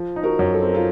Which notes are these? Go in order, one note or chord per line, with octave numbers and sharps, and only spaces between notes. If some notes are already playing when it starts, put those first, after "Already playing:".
Already playing: F3
D#4
F#4 A#4
F#2
A4
C4 A#4
F4 A4